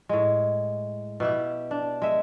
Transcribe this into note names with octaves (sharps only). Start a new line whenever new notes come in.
A2 G#3
B2 E4 G4
D4
G#3 E5